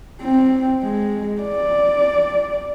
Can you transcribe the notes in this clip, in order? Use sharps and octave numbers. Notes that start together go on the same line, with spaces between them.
C4
G#3
D5